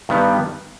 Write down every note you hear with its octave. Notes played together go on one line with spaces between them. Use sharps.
G2 D#3 G3 B3